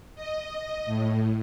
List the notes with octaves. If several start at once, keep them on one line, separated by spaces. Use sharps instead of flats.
D#5
A2